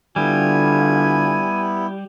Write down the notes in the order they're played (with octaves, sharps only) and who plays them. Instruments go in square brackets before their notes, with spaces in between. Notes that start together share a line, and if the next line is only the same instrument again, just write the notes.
[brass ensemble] D3 F4 [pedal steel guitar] G3 [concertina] B3 E4 [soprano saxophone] G#5